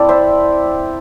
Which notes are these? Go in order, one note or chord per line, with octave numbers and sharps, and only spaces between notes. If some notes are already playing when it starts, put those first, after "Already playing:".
Already playing: C4 E4 A4 D5
C5 E5